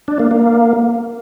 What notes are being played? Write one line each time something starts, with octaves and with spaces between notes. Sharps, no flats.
D4
A#3
A#3